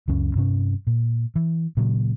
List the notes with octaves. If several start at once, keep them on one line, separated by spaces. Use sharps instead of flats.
C#2 F#2 C#4
G2 C3 C#4
A#2
E3
A#2 C#3 F#3